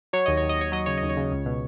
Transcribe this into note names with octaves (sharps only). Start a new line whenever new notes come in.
F#3 C#5
D#2 D#5
C#5
D#2
D#5
D#2 C#5
F#3 D#5
C#3 C#5
D#2 D#5
C#5
C#3
C#2
B2